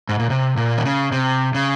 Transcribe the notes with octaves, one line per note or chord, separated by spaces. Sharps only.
G#2
A#2
C3
A#2
D#3
C#3
C3
C#3